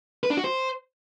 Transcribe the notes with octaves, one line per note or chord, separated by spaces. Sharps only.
B4
D4
F#4
C5